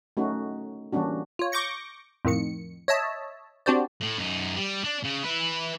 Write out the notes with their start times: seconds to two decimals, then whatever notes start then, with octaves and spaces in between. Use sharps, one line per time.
0.17 A3 C#4 D#4 F#4
0.92 E3 G3 A#3 C#4 D4 F#4
1.39 F4 C#5
1.52 C#6 D6 G6 A#6 C#7
2.25 F2 A2 D#3 C#7
2.88 C#5 D#5 E5 A5
3.66 C4 D4 F#4 G4 C5 D5
4.01 A2
4.18 F#2 D#4
4.57 G3
4.84 D4
5.04 C#3
5.23 E4 B4